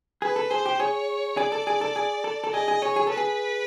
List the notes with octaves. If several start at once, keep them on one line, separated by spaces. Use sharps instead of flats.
G#4 B4
A4
G#4 C5
G4
G#4 C#5
G#4 D5
A4
G#4
A4
G#4
A4
A4
G#4 D#5
G#4
G#4 C#5
G#4
A4 B4
G#4